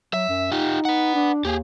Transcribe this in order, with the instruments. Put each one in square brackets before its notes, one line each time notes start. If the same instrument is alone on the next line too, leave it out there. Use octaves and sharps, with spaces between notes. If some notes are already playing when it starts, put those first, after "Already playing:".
[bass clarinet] F#3 [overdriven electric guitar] E5
[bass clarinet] F#2
[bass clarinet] D#4 [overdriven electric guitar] F4 G4
[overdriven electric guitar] B4 F#5
[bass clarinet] D4
[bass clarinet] D#2 [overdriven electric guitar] G4 G#4